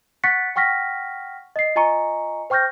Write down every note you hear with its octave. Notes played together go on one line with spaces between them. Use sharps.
F#5 C#6 F#6 A6 B6 C#7
F#5 G5 C#6 F6 A#6 B6
D#5 C7
F4 D#5 G#5 A#5 C#6 C#7
C5 G5 C#6 F6 G6 A#6